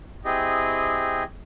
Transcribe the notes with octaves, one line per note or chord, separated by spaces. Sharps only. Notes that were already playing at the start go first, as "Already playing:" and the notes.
C4 E4 G4 G#4 D#5